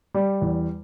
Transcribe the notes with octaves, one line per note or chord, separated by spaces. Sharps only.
G3
E2